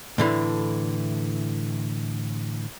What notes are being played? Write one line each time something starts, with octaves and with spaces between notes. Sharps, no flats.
A2 D3 E3